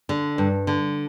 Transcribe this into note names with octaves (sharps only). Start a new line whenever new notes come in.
D3
G2
D3